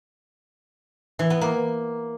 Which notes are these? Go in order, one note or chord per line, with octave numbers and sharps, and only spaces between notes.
E3
B3
A#3